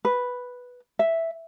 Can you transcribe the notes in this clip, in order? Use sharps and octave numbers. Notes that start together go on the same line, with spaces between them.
B4
E5